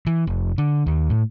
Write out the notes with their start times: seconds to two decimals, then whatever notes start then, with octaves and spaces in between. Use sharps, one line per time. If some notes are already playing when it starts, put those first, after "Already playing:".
0.07 E3
0.27 F1
0.58 D3
0.86 D#2
1.10 A2